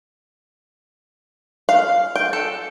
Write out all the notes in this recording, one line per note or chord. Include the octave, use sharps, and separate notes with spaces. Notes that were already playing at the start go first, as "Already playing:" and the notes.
F5
G5
A4